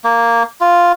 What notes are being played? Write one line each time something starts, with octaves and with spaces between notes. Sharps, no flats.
A#3
F4